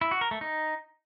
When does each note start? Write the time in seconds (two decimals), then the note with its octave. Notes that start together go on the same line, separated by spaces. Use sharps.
0.01 E4
0.11 F#4
0.21 A#4
0.31 A3
0.41 D#4